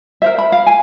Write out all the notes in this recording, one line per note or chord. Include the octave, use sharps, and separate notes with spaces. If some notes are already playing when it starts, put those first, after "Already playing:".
A#4 C5 E5
B5
F5
G#5